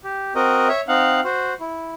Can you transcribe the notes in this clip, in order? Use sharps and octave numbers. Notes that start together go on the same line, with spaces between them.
G4
C4 F#4 A#4 D#5
C#5 E5
C4 D#4 F5 F#5
F#4 C5
E4